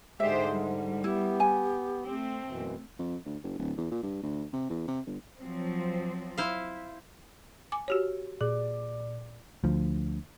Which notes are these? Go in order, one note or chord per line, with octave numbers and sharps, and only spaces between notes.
G#2 D3 G#3 G4 C5 D5 E5
G3
B3 E4 G4
G#5
A3 C4
F#2 B2 E3
F2
D2
F#1
D1
E2
A#2
G2
D2
C3
E2
C3
G1
F3 F#3 C4
E4 C5 F5
G#5 D6
F#4 G4 C#5
A#2 G#4 D5 D6
D2 F3